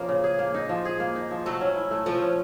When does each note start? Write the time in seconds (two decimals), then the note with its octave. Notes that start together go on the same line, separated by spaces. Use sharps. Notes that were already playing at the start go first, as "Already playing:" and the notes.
Already playing: F3 A#3 C#4
0.09 C#3
0.24 G#4
0.39 A#3
0.54 D#4
0.69 F3
0.85 G#4
1.00 A#3
1.15 D#4
1.31 F3
1.46 F#3 A3
1.61 C#4
1.76 E4
1.91 A3
2.06 F3 A3
2.22 C#4